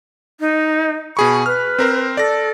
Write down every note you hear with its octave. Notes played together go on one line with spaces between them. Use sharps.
D#4
B2 G#4 B5 C#6
B4 F6
C4 A#4 C5
A4 D5 A#6